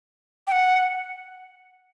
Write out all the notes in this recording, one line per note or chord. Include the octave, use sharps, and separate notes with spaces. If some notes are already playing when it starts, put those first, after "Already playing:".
G5
F#5